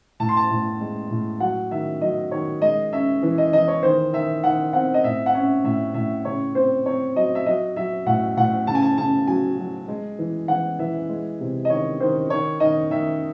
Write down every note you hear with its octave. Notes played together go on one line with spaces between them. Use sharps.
A2 A5
C6
A5
A2
G#3
A2
F#3 F#5
D#3 E5
F#3 D#5
D#3 C#5
G#3 D#5
C#4 E5
E3
D#5
E3 D#5
C#5
D#3 C5
D#3 E5
D#3 F#5
C4 F#5
D#5
A2 E5
F#5
C#4 E5
A2 E5
A2 E5
C#3 C#5
C4 C5
C4 C#5
F#3 D#5
E5
F#3 D#5
F#3 E5
A2 F#5
A2 F#5
C#3 A5
G#5
A5
C#3 A5
F#3 G#5
F#3
G#3
E3
E3 F#5
E3 E5
G#3
C3
D#5
D#3 C#5
D#3 C5
D#3 C#5
D#3 D#5
D#3 E5